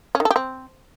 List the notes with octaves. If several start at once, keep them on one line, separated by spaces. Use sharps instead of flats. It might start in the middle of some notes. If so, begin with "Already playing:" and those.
C#4
D#3
A4
G4
C4